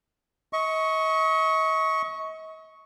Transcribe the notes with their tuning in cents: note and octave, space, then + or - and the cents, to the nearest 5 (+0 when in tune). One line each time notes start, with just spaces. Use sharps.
D#5 +40 C#6 +0